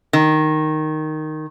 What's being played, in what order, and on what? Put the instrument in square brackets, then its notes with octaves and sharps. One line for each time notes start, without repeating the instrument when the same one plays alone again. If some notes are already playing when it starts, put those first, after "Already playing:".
[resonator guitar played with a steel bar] D#3